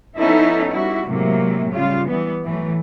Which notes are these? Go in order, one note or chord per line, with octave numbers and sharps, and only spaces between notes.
F3 B3 C#4 D#4 E4 A4
G3 E4 F#4
A2 C3 F#3 G#3 A#3
C#3 G3 F4
E3 G3 B3
A2 E3 F#3 A3